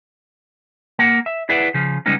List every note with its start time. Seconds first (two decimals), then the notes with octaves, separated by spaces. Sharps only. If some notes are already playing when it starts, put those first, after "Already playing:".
0.99 A#3 A#4 F#5
1.26 E5
1.49 E4 G#4 B4 D5 E5 F#5
1.74 C#3 F3
2.06 C#3 G3 G#3 B3 C#4 D#4